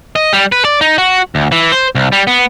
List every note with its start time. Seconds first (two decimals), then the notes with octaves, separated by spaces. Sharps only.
0.16 D#5
0.33 G3
0.52 B4
0.65 D5
0.81 D#4
0.98 F#4
1.35 D2
1.52 E3
1.72 C5
1.95 C2
2.12 G3
2.27 B3